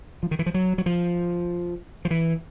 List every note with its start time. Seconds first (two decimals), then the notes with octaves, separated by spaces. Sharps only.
0.23 F3
0.31 D#3
0.39 E3
0.46 F3
0.54 F#3
0.78 F#3
0.86 F3
2.05 F3
2.11 E3